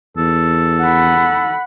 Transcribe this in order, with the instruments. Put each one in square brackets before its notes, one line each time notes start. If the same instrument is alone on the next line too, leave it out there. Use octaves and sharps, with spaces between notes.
[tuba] E2 [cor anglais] A4
[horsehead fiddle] F#5 B5